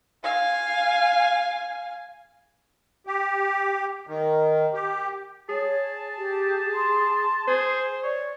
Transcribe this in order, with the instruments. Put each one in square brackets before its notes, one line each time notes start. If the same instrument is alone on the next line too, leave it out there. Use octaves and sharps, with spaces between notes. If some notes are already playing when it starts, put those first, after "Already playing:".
[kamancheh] F5 G#5
[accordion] G4
D#3
G4
[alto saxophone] G#4 [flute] C#5 [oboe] A5
[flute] G4
C6
[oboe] G#4 [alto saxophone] C5
[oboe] C#5 [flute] D5